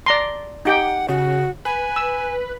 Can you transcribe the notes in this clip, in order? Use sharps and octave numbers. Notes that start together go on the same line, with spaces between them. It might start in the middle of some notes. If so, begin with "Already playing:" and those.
D5 A#5 C6
D#4 G4 F#5 G5
C#3 F#4
B4 G#5
E6